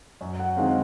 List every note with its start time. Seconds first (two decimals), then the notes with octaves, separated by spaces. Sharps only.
0.21 F#2
0.39 F#5
0.57 D#3 G#3 C4 F5